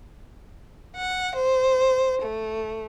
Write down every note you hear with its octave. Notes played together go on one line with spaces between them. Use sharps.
F#5
C5
A3